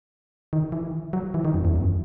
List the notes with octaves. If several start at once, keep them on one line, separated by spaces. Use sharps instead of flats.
D#3
E3
F#3
E3
D#3
F#2
E2
F#2